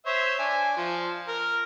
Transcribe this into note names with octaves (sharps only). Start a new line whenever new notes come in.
C5 C#5 E5
D4 G#5
F3
A#4